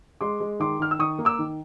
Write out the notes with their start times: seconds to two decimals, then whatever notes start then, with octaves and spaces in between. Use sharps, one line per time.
0.21 G#3 C6 D6
0.40 G#3
0.60 D#3 C6 D6
0.80 D#3 F6
0.91 E6
0.99 D#3 C#6 D#6
1.19 A#3
1.25 D6 E6
1.39 D#3